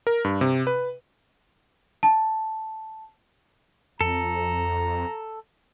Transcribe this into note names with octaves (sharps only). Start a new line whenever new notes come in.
A#4
G2
C3
B4
A5
F2 A4 A#5